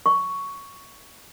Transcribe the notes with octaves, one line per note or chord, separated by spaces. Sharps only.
C#6